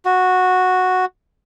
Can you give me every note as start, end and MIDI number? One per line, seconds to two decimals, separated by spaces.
0.05 1.05 66